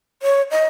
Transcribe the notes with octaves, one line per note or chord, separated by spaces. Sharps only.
C#5
D#5